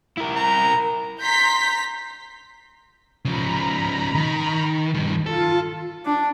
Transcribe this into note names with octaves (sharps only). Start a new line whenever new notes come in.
E4 A#4
A#5
A#5 C6 G6 B6
C#3 F3 A#5 B5
D#3
G2 D#3
F4 A4
D4